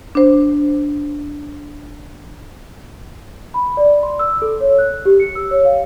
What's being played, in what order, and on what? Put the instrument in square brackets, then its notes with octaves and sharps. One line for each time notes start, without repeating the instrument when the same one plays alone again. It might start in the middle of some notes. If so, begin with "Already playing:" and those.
[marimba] D4 C5
[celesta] B5
D5
C6
E6
A4
C#5
F#6
G4
C#7
E6
C#5
F5